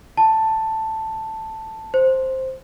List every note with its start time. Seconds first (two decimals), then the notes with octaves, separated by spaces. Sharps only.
0.17 A5
1.94 C5